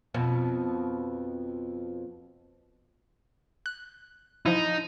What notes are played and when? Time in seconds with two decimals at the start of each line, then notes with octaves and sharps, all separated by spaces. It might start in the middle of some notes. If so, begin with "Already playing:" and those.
0.14 F2 B2
3.66 F#6
4.46 F3 D#4 E4